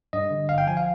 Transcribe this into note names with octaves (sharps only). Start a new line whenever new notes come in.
G2 D#5
D3
G1 F5
G5
F3 G#5
F5